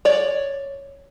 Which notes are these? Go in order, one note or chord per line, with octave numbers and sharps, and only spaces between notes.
C#5 D5